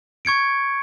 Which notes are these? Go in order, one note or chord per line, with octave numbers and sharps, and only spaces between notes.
C#6 G#6 C#7 D7